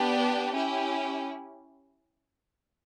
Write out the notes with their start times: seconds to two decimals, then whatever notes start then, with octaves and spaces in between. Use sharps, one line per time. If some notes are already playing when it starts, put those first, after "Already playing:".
Already playing: B3 D4 G4
0.53 C#4 E4 G4